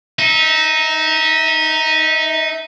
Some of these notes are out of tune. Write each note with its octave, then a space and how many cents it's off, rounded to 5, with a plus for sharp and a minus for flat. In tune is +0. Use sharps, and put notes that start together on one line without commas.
D#4 +0 E5 -30